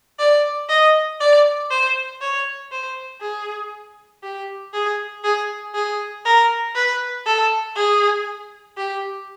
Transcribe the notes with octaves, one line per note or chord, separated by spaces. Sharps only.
D5
D#5
D5
C5
C#5
C5
G#4
G4
G#4
G#4
G#4
A#4
B4
A4
G#4
G4